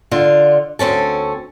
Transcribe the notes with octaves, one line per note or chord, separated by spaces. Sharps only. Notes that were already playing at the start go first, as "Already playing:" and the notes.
D3 F4
D2 C4 C#4 A4